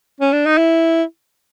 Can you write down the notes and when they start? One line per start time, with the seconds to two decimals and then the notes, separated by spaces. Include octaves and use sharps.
0.20 C#4
0.33 D4
0.46 D#4
0.58 E4